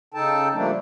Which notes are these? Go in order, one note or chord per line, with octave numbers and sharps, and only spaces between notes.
C#3 D#4 A4 G5 A5
F3 G3 A3 A#3 D4